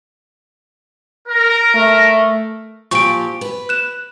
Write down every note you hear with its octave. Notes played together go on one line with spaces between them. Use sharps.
A#4
A3
A#2 F3 G4 C#6 D7
B4
F#6 E7